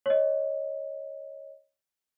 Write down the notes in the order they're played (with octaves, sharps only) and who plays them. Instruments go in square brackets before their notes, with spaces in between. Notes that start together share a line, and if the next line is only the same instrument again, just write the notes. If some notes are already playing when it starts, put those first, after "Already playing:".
[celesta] C#5 D#5